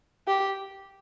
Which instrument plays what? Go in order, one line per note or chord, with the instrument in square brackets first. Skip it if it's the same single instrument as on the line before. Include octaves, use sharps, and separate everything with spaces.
[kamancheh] G4